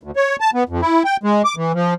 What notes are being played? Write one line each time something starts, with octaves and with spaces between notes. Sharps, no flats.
D2
C#5
A5
B3
F2
E4
G5
G#3
D6
E3
F3